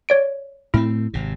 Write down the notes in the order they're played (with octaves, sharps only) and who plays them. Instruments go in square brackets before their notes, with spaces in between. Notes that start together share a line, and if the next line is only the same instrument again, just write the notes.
[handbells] C#5 D5 D7
[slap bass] A2 A3 C4 [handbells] E4
[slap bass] G#1 C3